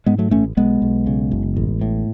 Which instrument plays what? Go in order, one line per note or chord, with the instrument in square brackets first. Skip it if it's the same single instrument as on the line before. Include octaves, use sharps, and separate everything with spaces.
[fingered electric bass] G#2 G#3 B3
F#3 A3
A1 A3 C#4
B1 G#3 B3
B1
C#3
F#1
A1
A2